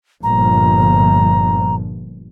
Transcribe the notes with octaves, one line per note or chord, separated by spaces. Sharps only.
G1 A#2 F3 A#5